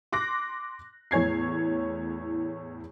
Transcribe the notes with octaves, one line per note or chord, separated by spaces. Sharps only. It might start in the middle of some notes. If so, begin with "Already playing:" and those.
C6 D6 F#6 A#6
E2 A2 C#5 G#6 C7